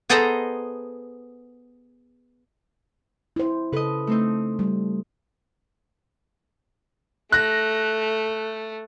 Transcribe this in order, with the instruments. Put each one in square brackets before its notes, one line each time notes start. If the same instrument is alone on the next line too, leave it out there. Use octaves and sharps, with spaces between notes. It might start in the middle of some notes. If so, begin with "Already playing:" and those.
[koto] B3 G#4 A4 C5 D#5 A#5
[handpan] E4 C5
[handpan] C#3 A4 [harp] B4 D#5
[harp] A3 C4 D#4
[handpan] G3
[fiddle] A3 [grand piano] F#6 A#6